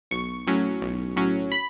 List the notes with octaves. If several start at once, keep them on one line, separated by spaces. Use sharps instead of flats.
B1 C#6
A2 F#3 C#4
B1
A2 F#3 C#4
B5